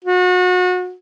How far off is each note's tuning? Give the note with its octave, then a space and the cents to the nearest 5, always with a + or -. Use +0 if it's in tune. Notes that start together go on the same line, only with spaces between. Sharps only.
F#4 -30